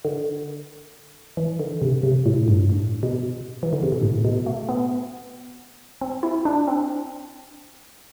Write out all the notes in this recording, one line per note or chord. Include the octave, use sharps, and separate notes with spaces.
D3
E3
D3
C3
C3
A2
G2
A2
B2
E3
D3
C3
B2
A2
B2
A3
B3
C4
E4
D4
C4